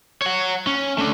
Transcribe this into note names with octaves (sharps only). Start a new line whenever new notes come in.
C#5 F#5
C#4
A3 D4